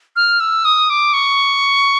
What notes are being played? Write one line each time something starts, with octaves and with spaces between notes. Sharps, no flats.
F6
E6
D#6
D6
C#6